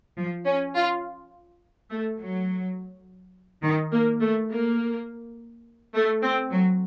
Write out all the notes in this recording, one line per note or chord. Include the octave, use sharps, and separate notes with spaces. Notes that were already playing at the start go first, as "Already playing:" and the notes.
F3
C#4
F4
A3
F#3
D#3
A#3
A3
A#3
A3
C4
F#3